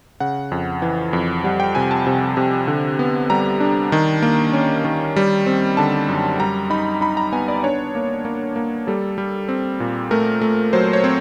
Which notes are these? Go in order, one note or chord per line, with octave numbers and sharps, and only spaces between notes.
C#3 F#5
F2
E3
F2
G3 F#5
G5
C3 G#5
A5
C3
C3
D3
B3
G3 A#5
D4
D#3
A#3
C#4
D#3
G3
C4
D3 A5
F#2
G3 A#5
D#4 B5
D#4 B5
A#5
B3 G#5
D5
D4 C#5
A#3
A#3
A#3
G3 A4
G3
C4
A#2
A3 A#4
A3
F#3 C5
C#5
C4